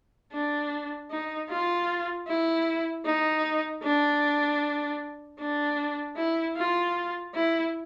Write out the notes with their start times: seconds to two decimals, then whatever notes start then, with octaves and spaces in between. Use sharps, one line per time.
0.32 D4
1.10 D#4
1.49 F4
2.27 E4
3.05 D#4
3.82 D4
5.39 D4
6.16 E4
6.56 F4
7.34 E4